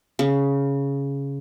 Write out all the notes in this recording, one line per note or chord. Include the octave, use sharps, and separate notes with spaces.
C#3